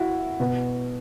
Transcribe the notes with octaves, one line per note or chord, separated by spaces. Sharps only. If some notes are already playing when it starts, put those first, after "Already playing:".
Already playing: E4 F#4
B2 B3